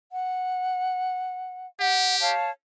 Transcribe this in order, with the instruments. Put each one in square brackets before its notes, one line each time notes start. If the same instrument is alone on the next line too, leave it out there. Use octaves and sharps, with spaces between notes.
[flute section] F#5
[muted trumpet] G4 [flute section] F#5
[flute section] C#5 F5 A5